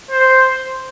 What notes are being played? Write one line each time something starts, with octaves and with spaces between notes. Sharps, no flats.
C5